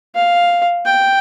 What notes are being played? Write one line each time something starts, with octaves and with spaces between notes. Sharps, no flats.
F5
G5